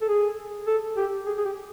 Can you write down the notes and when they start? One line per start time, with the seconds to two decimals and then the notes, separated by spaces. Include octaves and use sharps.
0.02 A4
0.09 G#4
0.67 A4
0.97 G4
1.26 G#4
1.38 G#4
1.45 G4